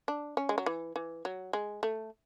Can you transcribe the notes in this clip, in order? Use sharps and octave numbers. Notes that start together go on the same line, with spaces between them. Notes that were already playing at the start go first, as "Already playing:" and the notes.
D4
C#4
G#3
F#3
E3
E3
F#3
G#3
A3